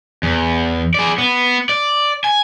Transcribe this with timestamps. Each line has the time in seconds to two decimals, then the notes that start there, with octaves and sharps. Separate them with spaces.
0.23 E2
0.94 G#4 D5
1.18 B3
1.69 D5
2.24 G#5